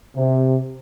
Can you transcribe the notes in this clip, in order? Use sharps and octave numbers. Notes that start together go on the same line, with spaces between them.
C3